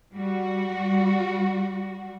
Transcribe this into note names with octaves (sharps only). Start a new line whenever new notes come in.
G3 F#4